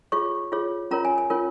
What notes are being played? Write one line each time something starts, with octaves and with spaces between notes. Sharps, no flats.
F4 G#4 C#5 C#6
F4 G#4 C#5
C#4 F4 A#4 C#5 A#5
G#5
G#5
C#4 F4 A#4 C#5